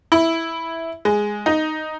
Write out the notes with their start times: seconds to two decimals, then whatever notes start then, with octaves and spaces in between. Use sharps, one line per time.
0.12 E4
1.05 G#3
1.46 D#4